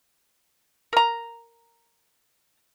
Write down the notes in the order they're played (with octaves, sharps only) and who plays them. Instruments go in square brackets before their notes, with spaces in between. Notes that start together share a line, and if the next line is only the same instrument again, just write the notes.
[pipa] A#4 A#5